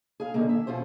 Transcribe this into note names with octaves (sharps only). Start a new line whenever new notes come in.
G#4 F5
D3 D#3 A#3
E5
E2 B2 F4 G#4 C5